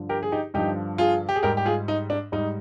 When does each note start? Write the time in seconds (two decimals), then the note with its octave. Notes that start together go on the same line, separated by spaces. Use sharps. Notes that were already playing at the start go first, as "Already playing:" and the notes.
Already playing: G2 D3 F3
0.09 G4 A#4
0.23 G#4
0.32 D#4 G4
0.54 G2 D3 F3 D#4 G4
0.98 F4 G#4
1.29 G4
1.36 G#4
1.43 G#2 G3 G4 A#4
1.57 G4
1.66 F4 G#4
1.88 D#4
2.10 D4
2.32 G#2 G3 D#4